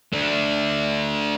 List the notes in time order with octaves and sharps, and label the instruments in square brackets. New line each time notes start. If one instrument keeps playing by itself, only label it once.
[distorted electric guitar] A3 D4